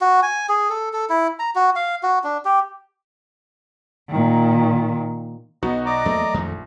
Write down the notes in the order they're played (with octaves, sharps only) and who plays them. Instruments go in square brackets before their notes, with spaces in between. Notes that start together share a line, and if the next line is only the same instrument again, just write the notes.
[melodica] F#4
G#5
G#4
A4
A4
E4
A#5
F#4
F5
F#4
D4
G4
[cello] A#2 D#3
[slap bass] B1 [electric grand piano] B3 D#4 F#4 [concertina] D#5
[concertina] D5 D#5 D6 [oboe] A#5
[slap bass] E2 F#3 A#3 [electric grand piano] A3
[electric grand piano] A#1 [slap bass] F2 D#3 A3